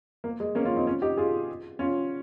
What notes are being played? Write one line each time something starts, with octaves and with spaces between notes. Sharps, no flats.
A#3
G#3
A#3 C#4
C#4 F4
C4 D#4
C#4 F4
D#4 G4
F4 G#4
C#4 F4